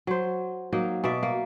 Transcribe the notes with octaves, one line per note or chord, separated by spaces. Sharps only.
F#3 C5
F#3 A#3 D#4
B2 D5 E5
A#3